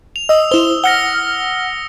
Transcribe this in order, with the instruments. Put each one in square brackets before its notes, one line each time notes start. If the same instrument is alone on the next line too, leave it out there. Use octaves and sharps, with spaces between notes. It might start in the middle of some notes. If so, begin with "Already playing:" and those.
[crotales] F7
[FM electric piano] D#5 [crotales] D#6 E6
[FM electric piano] E4 C5 [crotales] G7
[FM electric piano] F#5 F6 [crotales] A#6 C#7 G7